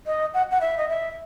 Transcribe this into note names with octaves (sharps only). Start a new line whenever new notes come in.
D#5
F#5
F#5
E5
D#5
E5